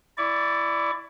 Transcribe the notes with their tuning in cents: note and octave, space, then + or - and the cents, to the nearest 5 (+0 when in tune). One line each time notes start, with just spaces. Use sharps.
E4 +10 D5 +0 C#6 +35